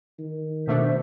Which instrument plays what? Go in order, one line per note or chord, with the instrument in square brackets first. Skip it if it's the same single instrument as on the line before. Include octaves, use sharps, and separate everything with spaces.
[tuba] D#3
[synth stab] B2 A3 D4 [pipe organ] C5 E5